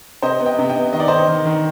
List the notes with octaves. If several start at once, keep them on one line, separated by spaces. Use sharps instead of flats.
C3 C5 D#5
B3
D#5 G5
C3
D#5 G5
B3
D#3 D#5
D5
D#3 C5 D#5
D#3
D#3